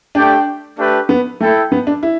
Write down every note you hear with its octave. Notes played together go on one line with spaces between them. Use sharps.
A3 D4 G4 D5 G5
A3 D4 G4 B4
B3
A3 E4 A4 G5
B3
D4
E4